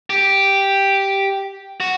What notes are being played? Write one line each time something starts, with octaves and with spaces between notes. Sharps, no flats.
G4
F#4